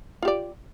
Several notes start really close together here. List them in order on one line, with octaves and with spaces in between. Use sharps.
F4 G4 D5